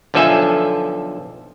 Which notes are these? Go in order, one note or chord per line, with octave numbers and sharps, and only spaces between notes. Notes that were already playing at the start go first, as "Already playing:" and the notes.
B1 D3 F3 A4 E5 G#5